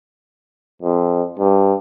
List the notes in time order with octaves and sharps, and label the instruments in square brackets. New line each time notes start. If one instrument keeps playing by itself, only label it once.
[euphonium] F2
G2